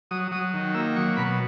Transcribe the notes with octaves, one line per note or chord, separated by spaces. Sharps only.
F#3 D#6
F#3 D#6
D#3
A#3 E6
F#3 C#6
B2 B5